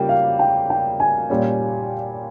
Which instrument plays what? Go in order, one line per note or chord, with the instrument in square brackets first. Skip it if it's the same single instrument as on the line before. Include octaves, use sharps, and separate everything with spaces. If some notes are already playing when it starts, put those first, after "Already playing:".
Already playing: [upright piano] C#3 G3 A#3 F4 [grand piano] G5
[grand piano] F5
G5
G5
G#5
[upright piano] A#2 G3 C#4